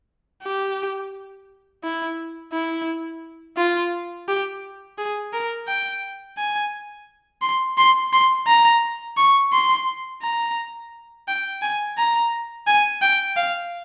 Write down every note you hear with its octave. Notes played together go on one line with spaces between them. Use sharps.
G4
E4
E4
F4
G4
G#4
A#4
G5
G#5
C6
C6
C6
A#5
C#6
C6
A#5
G5
G#5
A#5
G#5
G5
F5